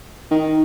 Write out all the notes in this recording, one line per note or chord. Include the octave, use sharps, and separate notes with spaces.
D#3